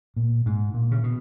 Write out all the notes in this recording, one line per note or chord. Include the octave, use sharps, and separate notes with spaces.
A#2
G#2
A#2
C#3
B2